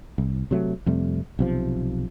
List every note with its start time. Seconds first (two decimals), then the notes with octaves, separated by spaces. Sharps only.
0.18 C2
0.51 C3 F#3 A3
0.86 F2 C3 G3 A3
1.39 B1 C3 F3